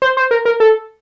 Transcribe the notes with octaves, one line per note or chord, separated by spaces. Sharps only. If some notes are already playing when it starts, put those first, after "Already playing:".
C5
C5
A#4
A#4
A4